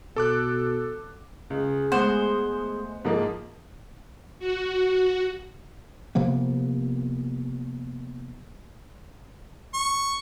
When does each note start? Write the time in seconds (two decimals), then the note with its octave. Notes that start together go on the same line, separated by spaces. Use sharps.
0.16 B2 A4 D6 F#6
1.50 C#2 G#4
1.92 G#3 A3 B3 C5 F#5
3.05 G#2 F3 A#3 G#4
4.39 F#4
6.15 C3 F3 A#3 B3
9.74 C#6